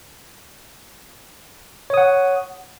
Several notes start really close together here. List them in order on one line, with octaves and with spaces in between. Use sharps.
C#5 D#6 F#5